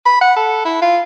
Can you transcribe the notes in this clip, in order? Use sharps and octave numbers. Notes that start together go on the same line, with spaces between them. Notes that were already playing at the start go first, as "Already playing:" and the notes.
B5
F#5
A4
E4
F4